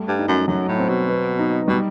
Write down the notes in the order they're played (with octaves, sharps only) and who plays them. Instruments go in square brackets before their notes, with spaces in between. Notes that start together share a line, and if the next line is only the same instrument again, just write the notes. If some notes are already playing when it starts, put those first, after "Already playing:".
Already playing: [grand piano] G3 A3
[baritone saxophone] G2
[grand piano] D#4
[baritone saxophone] F#2
[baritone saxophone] F#2 [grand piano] F#3
[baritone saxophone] A2
[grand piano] C4
[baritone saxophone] B2
[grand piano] B3
D#4
[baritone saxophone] B2 [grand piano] G3